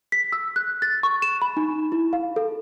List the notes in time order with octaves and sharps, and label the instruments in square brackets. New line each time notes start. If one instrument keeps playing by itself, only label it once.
[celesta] B6
E6
F#6
A6
C#6
E7
B5
D#4
E4
F5
A4